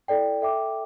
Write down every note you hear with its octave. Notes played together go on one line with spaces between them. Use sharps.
E4 A4 D5 G5
A4 E5 G5 D6